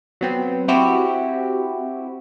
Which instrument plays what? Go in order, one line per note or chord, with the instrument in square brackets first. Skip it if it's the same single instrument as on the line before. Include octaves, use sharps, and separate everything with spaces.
[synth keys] F#3 B3 C4
C4 E4 F#4 G4